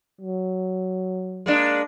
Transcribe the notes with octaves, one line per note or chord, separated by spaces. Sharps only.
F#3
G#3 A#3 D4